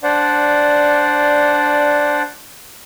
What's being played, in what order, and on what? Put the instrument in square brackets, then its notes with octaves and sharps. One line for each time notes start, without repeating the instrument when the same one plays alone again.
[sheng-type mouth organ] D4 C5 D5 F#5